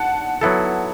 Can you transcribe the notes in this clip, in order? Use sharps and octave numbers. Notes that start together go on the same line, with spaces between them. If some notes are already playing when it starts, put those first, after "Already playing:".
Already playing: F#5 A5
F#3 B3 E4 A4